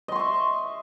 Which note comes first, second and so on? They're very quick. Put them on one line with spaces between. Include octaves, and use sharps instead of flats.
D#5 C6 C#6 E5